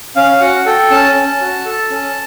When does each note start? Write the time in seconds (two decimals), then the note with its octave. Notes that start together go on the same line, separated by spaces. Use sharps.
0.16 C#4 F5
0.40 F#4 F#5
0.66 A4 G5
0.91 C#4 A5
1.15 C#4
1.41 F#4
1.65 A4
1.90 C#4